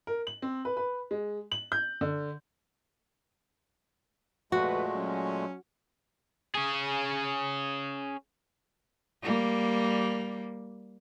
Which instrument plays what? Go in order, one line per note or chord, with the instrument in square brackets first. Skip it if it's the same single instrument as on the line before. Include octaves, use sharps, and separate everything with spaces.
[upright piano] A#4
F#7
C4
B4
B4
G#3
F#7
G6
D3
[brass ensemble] F2 B4 [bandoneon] A#2 G#3 A3 [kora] F#4
[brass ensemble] F#3 C#4
[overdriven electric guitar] C#4 G#4
[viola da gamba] G3 A#3